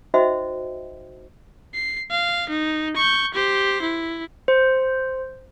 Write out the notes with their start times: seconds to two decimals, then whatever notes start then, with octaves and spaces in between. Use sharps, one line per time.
0.14 D#4 F#4 C5 D#5 E5 G5
1.75 C7
2.11 F5
2.50 D#4
2.97 C#6 G6
3.34 G4 C5
3.82 E4
4.48 C5